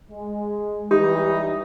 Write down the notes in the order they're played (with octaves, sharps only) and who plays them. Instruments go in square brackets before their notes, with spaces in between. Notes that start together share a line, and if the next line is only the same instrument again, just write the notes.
[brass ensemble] G#3
[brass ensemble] E3 G3 [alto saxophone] D#4 [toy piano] G4